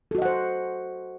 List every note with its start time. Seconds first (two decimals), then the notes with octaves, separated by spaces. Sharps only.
0.11 A4
0.15 F#4
0.18 D#5
0.22 F#5
0.25 C5